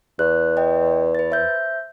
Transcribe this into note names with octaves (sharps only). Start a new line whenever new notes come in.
E2 F#6
D#5 G5
B4 A6
C5 E5 G6